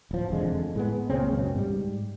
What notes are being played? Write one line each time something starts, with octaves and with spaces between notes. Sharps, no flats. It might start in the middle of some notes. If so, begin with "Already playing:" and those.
D1 F3
E1 F2 D3 G#3
A2 G#3 B3
C#2 A#2 C#3 C4
C#2 F#2 B2 C#4
G#2 G3